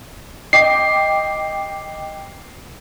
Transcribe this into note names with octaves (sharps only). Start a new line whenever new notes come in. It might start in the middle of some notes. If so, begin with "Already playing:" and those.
D#5 G5 D6 C7